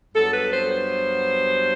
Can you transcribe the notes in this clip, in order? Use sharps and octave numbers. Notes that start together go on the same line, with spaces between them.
G2 F#3 B3 A4
B4
C5
C5